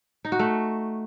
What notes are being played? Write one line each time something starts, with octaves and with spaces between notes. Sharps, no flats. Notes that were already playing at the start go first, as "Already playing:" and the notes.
D#4
F#4
A3